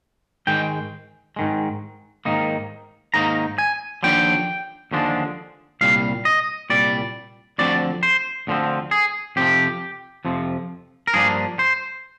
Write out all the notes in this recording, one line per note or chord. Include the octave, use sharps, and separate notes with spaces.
G#2 D#3 G#3 G5
G#2 D#3 G#3
G#2 D#3 A#3 D#4
G#2 D#3 A#3 D#4 A#5
G#5
D#2 D3 F3 D4 G5
D#2 D3 F3 G#3 D4
C2 A#2 G3 F5
D#5
C2 A#2 G3 D5
D2 D3 F3 C4 D5
C5
D2 D3 F3 C4
G#4
F2 C3 F3 G4
F2 C3 F3
A#4
G2 F3 A#3 D4 G#4
C5